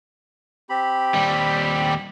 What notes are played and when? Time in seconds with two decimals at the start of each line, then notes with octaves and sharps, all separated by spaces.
0.70 C4 G4 B5
1.15 D#2 G3